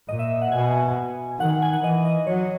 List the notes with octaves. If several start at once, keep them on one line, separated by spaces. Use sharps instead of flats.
A#2 D#5
E5
F#5
B2 G#5
D#3 F#5
F#5
G#5
F#5
E3 D#5
D#5
F#3 C#5